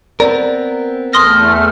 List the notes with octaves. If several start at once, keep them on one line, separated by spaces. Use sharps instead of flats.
B3 C4 A#4 D5
E2 A3 C6 D#6 F6 A#6